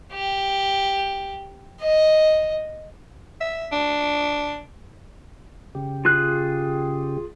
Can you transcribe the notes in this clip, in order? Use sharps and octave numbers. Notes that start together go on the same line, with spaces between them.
G4
D#5
E5
D4
C#3 G4
F4 G#4 F#6